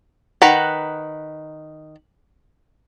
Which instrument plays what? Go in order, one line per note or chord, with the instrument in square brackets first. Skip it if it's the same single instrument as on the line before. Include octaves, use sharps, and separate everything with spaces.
[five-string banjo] D#3 B4 F#5 A#5